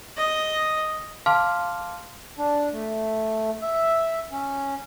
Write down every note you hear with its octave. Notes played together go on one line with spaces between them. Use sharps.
D#5
F5 A5 C6 D6 F6
D4
A3
E5
C#4